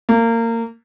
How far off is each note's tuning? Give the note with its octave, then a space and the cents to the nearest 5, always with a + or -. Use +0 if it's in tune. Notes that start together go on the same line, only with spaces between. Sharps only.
A#3 -25